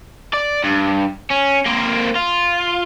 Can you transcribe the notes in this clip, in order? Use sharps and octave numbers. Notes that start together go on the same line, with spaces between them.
D5
G2
C#4
A#3 C4
F4